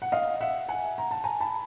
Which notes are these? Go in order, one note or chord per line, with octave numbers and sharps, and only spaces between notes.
F#5
D#5 F5
E5 F#5
F#5 G#5
A#5
A5
G#5 A#5
A5 B5